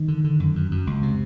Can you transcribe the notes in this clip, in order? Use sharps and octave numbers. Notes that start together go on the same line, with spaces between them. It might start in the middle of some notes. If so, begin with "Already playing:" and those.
Already playing: D#3
D3
D3
F#2
F#2
F#2
C#2
C3